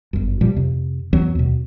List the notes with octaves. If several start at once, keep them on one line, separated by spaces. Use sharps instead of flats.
G1 F#2
A#2 F3 G3
F2 C3
E2 E3 F#3 C4
D#2 B2